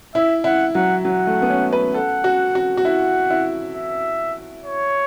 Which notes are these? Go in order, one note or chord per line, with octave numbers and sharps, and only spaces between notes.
E4 E5
E4 F#5
F#3 F#5
F#3 F#5
A3
B3
C#4
B4
A4 F#5
F#4
F#4
F#4
E4 F#5
E4
E5
C#5